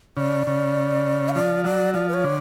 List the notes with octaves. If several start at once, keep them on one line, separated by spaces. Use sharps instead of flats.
C#3 D5
C#3
F5
F3 D5
F#3 D5
F3 D5
B4
C#5
D3